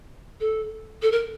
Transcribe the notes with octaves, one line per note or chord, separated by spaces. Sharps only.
A4
A4
A#4